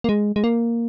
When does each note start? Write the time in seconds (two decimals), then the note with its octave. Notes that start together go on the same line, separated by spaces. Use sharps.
0.04 A#3
0.09 G#3
0.36 G#3
0.44 A#3